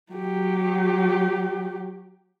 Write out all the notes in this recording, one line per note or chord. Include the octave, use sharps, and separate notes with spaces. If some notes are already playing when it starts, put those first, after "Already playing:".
F#3 G4